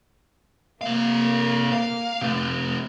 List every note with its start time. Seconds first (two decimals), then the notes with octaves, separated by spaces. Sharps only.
0.81 C3 A#3 F5
1.72 F5
2.21 C3 A3